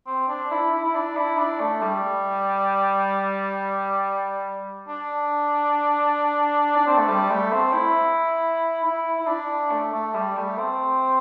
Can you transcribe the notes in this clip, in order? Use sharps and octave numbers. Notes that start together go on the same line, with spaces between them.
C4
D4
E4
E4
E4
D4
E4
D4
A3
G3
D4
D4
C4
A3
G3
A3
C4
E4
E4
E4
D4
A3
A3
G3
A3
C4